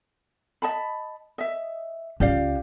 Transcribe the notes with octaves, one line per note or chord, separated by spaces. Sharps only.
D#5 A5 B5
D#5 E5
C#2 G4 D5 F5